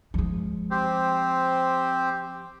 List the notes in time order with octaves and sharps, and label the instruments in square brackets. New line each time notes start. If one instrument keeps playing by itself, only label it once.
[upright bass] F3 G#3
[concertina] C4 G4 C5